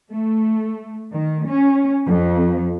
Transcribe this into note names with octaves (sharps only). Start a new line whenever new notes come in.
A3
D#3
C#4
F2